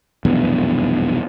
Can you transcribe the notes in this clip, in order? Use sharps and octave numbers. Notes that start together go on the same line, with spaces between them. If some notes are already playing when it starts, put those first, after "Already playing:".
F1 B1 E2 G2